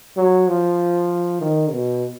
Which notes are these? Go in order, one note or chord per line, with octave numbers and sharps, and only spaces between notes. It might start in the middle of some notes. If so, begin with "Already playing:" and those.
F#3
F3
D#3
B2